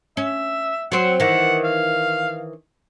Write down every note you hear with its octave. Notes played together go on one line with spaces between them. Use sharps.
C#4 E5
F#3 C4 F#5
D#3 E3 F#5
F5